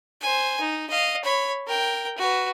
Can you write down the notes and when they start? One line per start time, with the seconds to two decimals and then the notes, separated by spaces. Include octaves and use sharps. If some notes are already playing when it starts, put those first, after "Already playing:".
0.21 C5 G#5
0.60 D#4
0.90 D#5 F5
1.24 C#5 B5
1.67 A#4 G5
2.17 F#4 B4